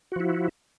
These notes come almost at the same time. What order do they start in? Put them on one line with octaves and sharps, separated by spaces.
F#4 F3 E4